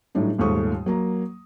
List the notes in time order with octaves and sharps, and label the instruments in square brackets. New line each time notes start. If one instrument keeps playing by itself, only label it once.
[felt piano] A2 F#3 G3 D4 D#4
D#1 D#2 G#2 A3 C#6 D#6
F#3 A#3 A#5